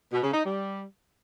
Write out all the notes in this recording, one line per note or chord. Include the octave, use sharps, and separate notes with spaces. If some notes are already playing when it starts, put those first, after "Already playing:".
B2
C#3
D#4
G3